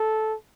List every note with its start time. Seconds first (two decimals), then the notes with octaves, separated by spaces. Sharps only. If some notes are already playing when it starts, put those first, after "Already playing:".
Already playing: A4